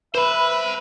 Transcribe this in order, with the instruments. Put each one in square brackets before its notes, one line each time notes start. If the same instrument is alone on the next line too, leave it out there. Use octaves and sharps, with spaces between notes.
[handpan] B4 [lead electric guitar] C5 B5 [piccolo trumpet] E5